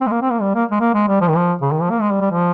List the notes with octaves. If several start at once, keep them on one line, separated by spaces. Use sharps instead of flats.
C4
G#3
A#3
C4
A#3
G3
A#3
G#3
A#3
G#3
G3
F3
D#3
F3
C#3
D#3
F3
A#3
G#3
G3
G3
F3